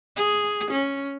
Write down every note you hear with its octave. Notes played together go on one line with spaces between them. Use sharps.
G#4
C#4